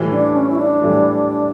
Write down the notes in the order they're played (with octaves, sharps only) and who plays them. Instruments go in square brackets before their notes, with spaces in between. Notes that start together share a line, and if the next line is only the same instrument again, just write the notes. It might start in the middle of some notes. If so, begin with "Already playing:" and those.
Already playing: [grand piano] A2 E3 G3
[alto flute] D4
C#4
E4
D4
[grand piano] A2 E3 G3